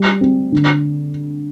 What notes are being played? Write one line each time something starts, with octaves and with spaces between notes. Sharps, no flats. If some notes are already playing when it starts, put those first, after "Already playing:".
Already playing: G3
C4
D3